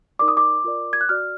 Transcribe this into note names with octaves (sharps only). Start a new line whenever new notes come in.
D#4 A#4 D5 D6
D#6
D6
F4 A#4 D5
G#6
F#6
F#4 D5 F6